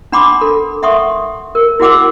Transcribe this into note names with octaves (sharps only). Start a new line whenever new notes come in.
D4 F#5 B5 C6 D6
A4
E5 F#5 C6 C#6 D#6
A#4
E4 F#4 G#4 F#5 D6 E6